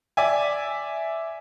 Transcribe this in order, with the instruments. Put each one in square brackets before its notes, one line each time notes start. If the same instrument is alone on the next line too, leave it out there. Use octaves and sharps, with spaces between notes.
[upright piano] D5 E5 G#5